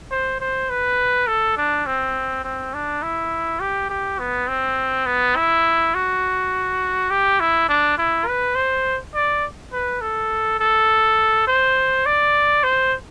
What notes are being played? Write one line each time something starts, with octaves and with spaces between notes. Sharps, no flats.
C5
C5
B4
A4
D4
C4
C4
D4
E4
G4
G4
B3
C4
B3
E4
F#4
G4
E4
D4
E4
B4
C5
D5
B4
A4
A4
C5
D5
C5